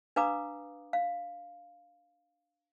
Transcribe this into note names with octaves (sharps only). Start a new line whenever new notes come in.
D4 B4 F5 A#5 D6 D#6
F5